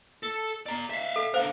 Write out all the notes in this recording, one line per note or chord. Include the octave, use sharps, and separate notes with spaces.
A4
D5 A#5
E5 F5
A4
D3 A#4 C5 F5